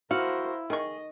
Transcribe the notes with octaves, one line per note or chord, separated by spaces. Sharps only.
E4 F#4 A#4 C5 F5
D#3 G#4 D#5 C#6